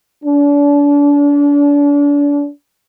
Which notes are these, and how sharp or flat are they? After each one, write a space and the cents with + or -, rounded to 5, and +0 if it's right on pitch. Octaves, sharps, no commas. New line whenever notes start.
D4 -35